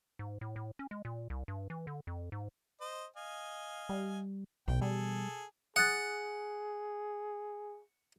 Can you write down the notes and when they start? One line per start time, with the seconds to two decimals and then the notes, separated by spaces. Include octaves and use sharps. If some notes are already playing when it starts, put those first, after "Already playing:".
0.19 G#2
0.41 A2
0.56 A2
0.79 C#4
0.91 G#3
1.05 A#2
1.30 C2
1.48 G2
1.70 E3
1.87 D3
2.07 F2
2.32 G#2
2.81 C5 D#5
3.16 D#5 F5 G#5
3.89 G3
4.68 B1 B2 E3 G5
4.81 G3 G#4 A4
5.76 G#4 F#5 D#6 F#6 A6